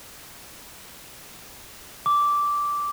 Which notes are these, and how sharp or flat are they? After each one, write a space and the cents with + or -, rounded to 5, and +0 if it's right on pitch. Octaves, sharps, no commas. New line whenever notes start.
D6 -10